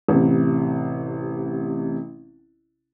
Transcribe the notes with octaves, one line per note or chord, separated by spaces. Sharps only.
A1 C3